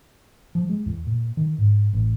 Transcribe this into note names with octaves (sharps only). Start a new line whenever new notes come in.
F3
G#3
E2
A#2
D#3
G#2
A1